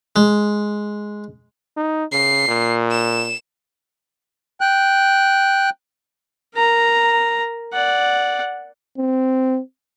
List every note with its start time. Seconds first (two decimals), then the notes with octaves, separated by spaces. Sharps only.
0.16 G#3
1.77 D#4
2.12 C#3 C7
2.48 A#2
2.91 E7
4.61 G5 F#6
6.55 A#4 A#5
7.73 D5 F#5
8.98 C4